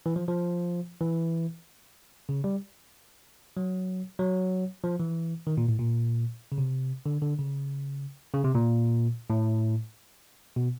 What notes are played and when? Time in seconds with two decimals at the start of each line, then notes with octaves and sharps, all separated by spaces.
0.06 E3
0.16 F3
0.28 F3
1.01 E3
2.29 C#3
2.44 G3
3.57 F#3
4.19 F#3
4.84 F3
5.00 E3
5.47 D#3
5.57 A#2
5.68 A2
5.79 A#2
6.52 C#3
6.58 C3
7.06 D3
7.22 D3
7.38 C#3
8.34 C#3
8.44 C3
8.55 A#2
9.30 A2
10.56 B2